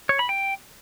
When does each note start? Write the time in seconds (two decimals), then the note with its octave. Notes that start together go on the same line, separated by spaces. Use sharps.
0.09 C#5
0.19 B5
0.29 G5